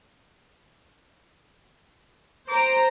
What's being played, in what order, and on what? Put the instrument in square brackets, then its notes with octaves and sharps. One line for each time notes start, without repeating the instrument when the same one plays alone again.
[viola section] C5 A#5 [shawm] D6